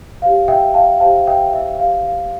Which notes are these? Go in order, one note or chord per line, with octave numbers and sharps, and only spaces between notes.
G4 C5 F5
E5 G5
F5 A5
G4 C5 F5 A5
E5 G5
E5 G5
G4 C5 F5
F5